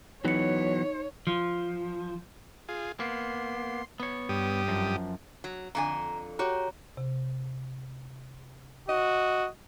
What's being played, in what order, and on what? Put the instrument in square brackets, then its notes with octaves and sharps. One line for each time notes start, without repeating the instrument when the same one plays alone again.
[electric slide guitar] E3 F#3 B3 [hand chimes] D#4 C#7 [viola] C#5
[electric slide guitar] F3
[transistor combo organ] F4 G#4
[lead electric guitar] A#3 B3 [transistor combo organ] C6
[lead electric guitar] B3 C#5
[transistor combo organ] G2 G4 D#6
[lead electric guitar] F#2 F3
[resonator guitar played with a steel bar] F#3
[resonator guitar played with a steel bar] F2 D3 G#5 [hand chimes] A#5
[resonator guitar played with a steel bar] F#4 G4 [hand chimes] C#5 A#5
[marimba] C3
[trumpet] F#4 [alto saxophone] D#5